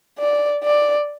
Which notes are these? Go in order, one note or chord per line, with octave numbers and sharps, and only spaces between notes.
D5
D5